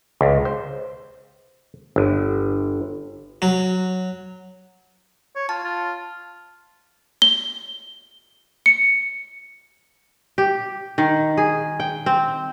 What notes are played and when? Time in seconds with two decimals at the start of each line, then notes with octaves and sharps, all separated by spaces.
0.21 C#2
0.45 C5
1.96 G1
3.42 F#3
5.36 C#5
5.49 F4 A5
5.63 F4
7.22 G7
8.66 C#7
10.38 G4
10.98 D#3
11.37 G#4
11.80 G5
12.06 C4